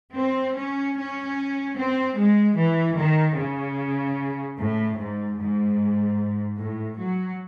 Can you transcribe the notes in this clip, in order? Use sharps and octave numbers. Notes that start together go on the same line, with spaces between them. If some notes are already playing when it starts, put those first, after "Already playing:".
C4
C#4
C#4
C4
G#3
E3
D#3
C#3
A2
G#2
G#2
A2
F#3